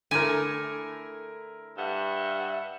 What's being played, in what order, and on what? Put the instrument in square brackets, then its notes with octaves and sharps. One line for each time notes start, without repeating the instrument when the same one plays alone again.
[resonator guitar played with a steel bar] D3 A3 [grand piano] E4 A#4 [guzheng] G#5
[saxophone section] G2 E5 F#5